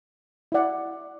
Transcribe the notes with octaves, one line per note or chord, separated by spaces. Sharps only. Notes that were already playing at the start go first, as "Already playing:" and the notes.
E4 D5 F#5